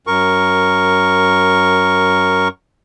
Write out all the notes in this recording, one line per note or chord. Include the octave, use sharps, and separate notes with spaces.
F#2 A#4 C#6